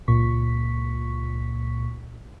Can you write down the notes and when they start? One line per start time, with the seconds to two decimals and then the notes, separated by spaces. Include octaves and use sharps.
0.08 C#2 A#2 C#6 B6